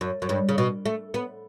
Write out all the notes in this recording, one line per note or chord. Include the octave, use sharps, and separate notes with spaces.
F#2
F#2
G2
C#3
B2
A3
B3